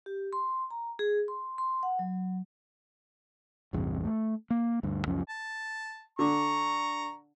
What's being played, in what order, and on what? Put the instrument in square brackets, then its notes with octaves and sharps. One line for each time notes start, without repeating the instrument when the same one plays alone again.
[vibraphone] G4
C6
A#5
G#4
C6
C6
F#5
F#3
[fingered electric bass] A1 E2 G2 C3
A3
A#3
D2 G2
C#2 F#2 F3 C#4
[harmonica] A5
[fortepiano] D3 [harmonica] A#5 C#6